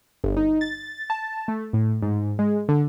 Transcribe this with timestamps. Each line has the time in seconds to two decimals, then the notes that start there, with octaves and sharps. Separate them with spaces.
0.24 G1
0.37 D#4
0.61 A6
1.10 A5
1.48 A3
1.73 A2
2.02 G#2
2.39 G#3
2.69 D3